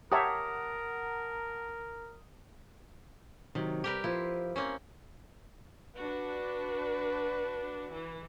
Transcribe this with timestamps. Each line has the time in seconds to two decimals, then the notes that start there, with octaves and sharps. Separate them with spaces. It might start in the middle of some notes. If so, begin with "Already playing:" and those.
0.12 G4 A#4 C#5 E5 F#5 A5 A#5 D#6
3.55 C3 D#3 F#3
3.84 G3 G4 A#4 B4
4.04 F3 E4 F4 C5
4.56 A#3 C4 C#4
5.97 D4 F#4 B4
7.91 E3